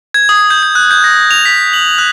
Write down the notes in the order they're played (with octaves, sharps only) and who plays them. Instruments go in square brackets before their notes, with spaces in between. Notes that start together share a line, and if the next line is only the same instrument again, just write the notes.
[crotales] G#6
D#6
G6
G6
F#6
G6
A#6
F7
B6
F#7
F#6